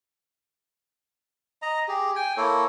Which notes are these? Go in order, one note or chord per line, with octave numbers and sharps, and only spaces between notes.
D#5 A#5
G4 G#4
G5 G#5
A#3 E4 A4 C#5